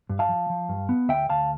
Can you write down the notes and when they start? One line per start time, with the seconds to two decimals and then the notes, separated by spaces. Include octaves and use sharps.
0.10 G2
0.19 F5 A5
0.29 F3
0.50 F3
0.69 G2
0.89 B3
1.09 D2 E5 G5
1.29 D2 F5 A5